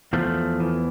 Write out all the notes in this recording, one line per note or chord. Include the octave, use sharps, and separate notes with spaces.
E2 F3 A3
E3